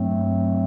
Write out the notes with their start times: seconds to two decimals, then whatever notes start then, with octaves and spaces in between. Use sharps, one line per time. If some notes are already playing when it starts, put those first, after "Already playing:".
Already playing: G2 F#3 A3 C4